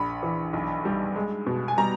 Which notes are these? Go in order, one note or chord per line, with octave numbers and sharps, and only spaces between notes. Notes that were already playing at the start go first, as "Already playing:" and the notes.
Already playing: A#1 B5
E3
B1
G3
G#3
B2
G#5
G3 A#5